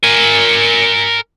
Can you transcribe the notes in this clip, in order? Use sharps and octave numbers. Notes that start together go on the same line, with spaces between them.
A#4 G#5